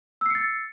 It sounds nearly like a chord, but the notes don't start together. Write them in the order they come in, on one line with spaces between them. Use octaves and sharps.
E6 C7 C#7 A6